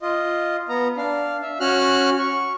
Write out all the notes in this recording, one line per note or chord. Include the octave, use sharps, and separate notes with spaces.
F4 D#5
B3 A#5
D4 F5
E5
C#4 F#4 F6 F#6
C#6